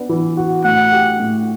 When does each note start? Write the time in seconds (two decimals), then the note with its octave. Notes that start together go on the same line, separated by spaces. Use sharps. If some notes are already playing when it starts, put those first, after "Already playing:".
Already playing: B3 D4
0.09 E3
0.37 F#4
0.64 A2 F#5
0.92 G4
1.20 A2